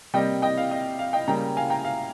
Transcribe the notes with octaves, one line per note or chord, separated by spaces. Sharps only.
C3 G3 A#3 D#5 G5
D#5 G5
F5
D#5
F5
D#5 G5
C#3 G3 A#3 G5 A#5
F5 G#5
G5 A#5
F5